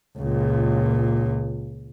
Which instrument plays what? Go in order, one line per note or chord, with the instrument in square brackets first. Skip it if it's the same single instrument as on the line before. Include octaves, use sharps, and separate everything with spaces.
[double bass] C#2 A#2